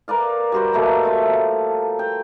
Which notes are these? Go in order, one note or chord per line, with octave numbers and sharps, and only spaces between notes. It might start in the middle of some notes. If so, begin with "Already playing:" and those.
A#4 B4 D5 F5
G3 F#4 C5
B2 A3 A#3
F4 E5 F5
F3
G5